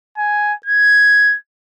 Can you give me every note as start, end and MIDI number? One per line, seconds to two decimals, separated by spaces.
0.18 0.53 80
0.66 1.36 92